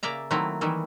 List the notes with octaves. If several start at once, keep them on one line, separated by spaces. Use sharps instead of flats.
C#3 A#3 D5 E5 A#5
D#3 F#3 A3 A#3 C4 E4
D#3 E3 G3 E4